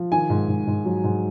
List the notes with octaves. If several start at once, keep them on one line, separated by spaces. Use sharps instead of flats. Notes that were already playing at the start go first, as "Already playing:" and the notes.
Already playing: F3
D#3 G#5
G#2
G#2
G#2
F#3
G#2